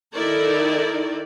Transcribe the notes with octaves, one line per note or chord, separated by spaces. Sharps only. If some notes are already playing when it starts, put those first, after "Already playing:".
D#3 D#4 E4 A4 A#4 D5